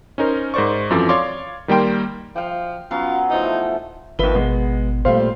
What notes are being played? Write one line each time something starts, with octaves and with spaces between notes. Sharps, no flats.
C#4 D#4 A#4 C5
G#2 A#4 C5 D5 C#6
F#2 E3 F3 C4 A4 D6
C#5 D5 F5 C6 D6
D#3 G3 A#3 G5 C6
F3 F5 G5
F#3 B3 C#4 F4
E3 F3 A3 D#4
G#1 D#2 F3 B4 E5 G7
B2 G#3 B3
A#2 G3 A3 C5 F5